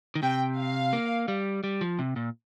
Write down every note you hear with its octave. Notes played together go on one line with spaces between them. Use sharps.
D#3
C3 G5
F5
A#3
G3
G3
F3
C3
A#2